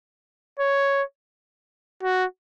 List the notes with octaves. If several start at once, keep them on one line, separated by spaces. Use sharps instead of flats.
C#5
F#4